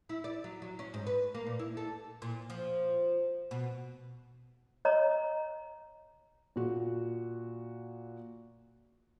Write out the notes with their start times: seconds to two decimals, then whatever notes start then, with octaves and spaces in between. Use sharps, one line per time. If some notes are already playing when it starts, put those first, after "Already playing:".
0.09 E4
0.24 D5
0.44 F#3
0.62 F#3
0.79 C#4
0.94 G#2
1.07 B4
1.35 A#3
1.47 A#2
1.59 E4
1.77 A4
2.22 A#2
2.50 F3
3.51 B2
4.85 C#5 D#5 A#5
6.56 A#2 F#4